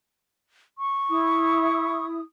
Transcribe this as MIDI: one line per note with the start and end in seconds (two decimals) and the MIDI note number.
0.78 2.05 85
1.09 2.19 64
1.09 2.19 87